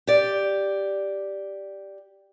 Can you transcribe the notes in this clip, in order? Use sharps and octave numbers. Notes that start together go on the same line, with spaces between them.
G4 D5